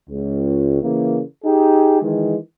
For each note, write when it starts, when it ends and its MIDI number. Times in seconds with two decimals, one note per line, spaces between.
0.10 0.79 37
0.82 1.21 49
0.82 1.21 52
0.82 1.21 58
1.45 2.00 63
1.45 2.00 67
1.45 2.00 68
2.02 2.36 51
2.02 2.36 52
2.02 2.36 56